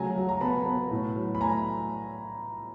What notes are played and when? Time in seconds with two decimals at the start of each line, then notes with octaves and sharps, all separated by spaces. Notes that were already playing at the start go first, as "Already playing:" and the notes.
Already playing: C#3 F#3 A3 G#5 A#5
0.16 F#3
0.29 A#5
0.41 B3 A5 B5
0.66 B3
0.91 A2
1.16 F#3
1.35 B5
1.41 A3 G#5 A#5